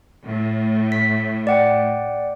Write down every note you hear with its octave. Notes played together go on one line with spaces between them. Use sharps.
A2
B6
D5 F#5 G5